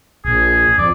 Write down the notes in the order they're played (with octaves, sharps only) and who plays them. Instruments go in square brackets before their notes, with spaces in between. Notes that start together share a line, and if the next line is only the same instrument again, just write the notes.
[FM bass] A#1 [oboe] G#4
[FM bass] F2 [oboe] D5